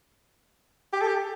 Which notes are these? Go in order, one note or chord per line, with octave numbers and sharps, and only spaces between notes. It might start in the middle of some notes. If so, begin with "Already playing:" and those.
G4
A4
G4